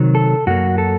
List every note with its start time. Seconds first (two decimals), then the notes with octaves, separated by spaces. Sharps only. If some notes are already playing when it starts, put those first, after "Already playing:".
Already playing: C3 D#3 F#3
0.15 A4
0.47 F#2 F#3 A#3 F#4
0.78 A4